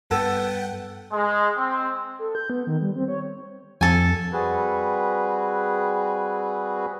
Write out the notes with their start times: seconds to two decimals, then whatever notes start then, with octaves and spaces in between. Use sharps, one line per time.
0.11 G2 B3 A4 F#5 G5
1.12 G#3
1.57 C4
2.19 A4
2.35 G6
2.50 B3
2.67 D#3
2.82 G3
2.95 C4
3.08 C#5
3.81 F2 A4 G#5
4.33 G3 C4 F#4 G#4 B4